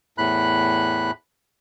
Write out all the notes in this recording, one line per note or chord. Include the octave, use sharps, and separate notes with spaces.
E2 A2 B5 F#6